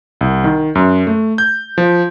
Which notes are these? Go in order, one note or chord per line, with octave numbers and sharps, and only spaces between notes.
C2
D#3
F#2
A3
G6
F3